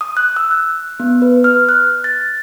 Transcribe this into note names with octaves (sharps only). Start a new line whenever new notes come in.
D#6
F#6
E6
F#6
B3
B4
F6
F#6
A6